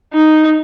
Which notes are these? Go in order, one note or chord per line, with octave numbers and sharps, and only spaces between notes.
D#4